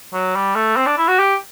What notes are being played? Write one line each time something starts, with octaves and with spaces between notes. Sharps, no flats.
F#3
G3
A3
C4
D4
E4
F#4
G4